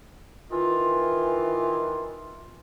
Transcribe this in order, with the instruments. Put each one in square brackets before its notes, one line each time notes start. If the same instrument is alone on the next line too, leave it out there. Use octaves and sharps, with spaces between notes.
[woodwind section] D#3 E3 F4